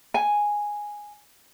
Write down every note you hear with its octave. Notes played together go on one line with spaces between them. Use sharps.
G#5